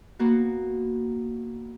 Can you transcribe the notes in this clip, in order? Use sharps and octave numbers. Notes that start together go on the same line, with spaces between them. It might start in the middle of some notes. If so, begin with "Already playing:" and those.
A#3 B3 F#4